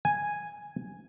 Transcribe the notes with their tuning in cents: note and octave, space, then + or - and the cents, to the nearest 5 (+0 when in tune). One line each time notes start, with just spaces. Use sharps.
G#5 -5